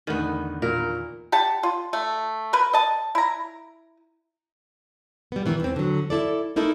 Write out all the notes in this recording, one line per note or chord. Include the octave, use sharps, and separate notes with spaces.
E2 A2 D3 D#3 B3
A#2 A#4
G4 F#5 A5
F4
A3
A#4 B4
D#5 A5
E4 A#5
G3 B3
D#3 E3 B3
E2 C4
D3 F#3
E4 A4 D5
A#3 D#4 E4 A4